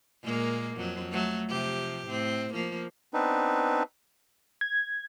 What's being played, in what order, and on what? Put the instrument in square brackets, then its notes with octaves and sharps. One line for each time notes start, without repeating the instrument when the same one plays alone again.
[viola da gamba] A#2 G#3 A#3
F2 F#3
F#3 A3
C3 F3 G4
A2 C4
F3 A#3
[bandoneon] B3 C4 D4 D#4 B4
[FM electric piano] G#6